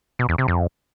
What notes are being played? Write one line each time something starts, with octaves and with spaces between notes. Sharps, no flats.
B2
E2
C3
F2